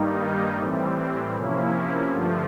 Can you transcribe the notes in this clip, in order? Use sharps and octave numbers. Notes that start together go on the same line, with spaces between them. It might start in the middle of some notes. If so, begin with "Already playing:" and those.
Already playing: G2 D#3 G3 A#3 D#4
A2 E3 G3 C4
C3 F3 A#3 C#4 E4
G2 D3 F3 A3